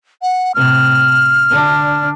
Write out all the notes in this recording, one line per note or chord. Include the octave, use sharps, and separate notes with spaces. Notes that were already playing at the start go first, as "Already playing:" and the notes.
F#5
A2 C3 F6
D3 D4